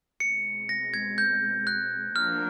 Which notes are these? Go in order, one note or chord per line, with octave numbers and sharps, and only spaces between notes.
B2 G#3 C4 C#7
A#6
G#6
G6
F#6
F3 A#3 D4 F#4 A#4 F6